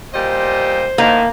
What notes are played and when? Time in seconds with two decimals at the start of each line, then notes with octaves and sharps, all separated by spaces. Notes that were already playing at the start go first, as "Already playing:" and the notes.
0.14 A#2 G3 C5 D#5
0.98 A2 D#3 A#3